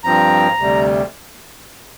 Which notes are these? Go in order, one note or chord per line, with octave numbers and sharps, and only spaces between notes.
G2 F3 C4 A#5
D2 C3 G3